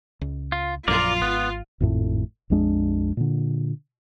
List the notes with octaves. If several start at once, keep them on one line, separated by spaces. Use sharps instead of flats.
C#2
F4
A#1 F#2 F4 A#4 D5
G#1 B3
G#1 F2 A2
A#1 F2 G#3 D4
A#2 D3